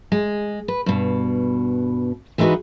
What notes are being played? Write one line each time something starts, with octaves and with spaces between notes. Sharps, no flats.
G#3
B4
G2 B2
E3 G#3 B3 D#4 F#4 B4